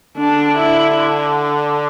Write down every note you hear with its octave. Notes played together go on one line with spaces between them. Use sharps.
D3 D4
E4